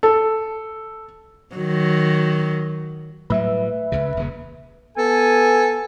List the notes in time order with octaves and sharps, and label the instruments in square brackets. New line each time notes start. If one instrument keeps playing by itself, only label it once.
[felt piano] A4
[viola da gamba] D#3 F#3
[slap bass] A2 F#3 G3 [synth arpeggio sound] B4 E5
[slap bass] C#2 C#3
D#1 C#3
[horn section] B3 G#5 [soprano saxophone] A4